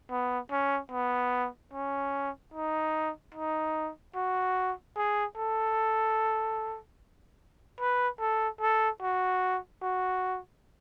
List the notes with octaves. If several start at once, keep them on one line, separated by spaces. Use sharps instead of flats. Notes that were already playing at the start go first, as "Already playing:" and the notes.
B3
C#4
B3
C#4
D#4
D#4
F#4
G#4
A4
B4
A4
A4
F#4
F#4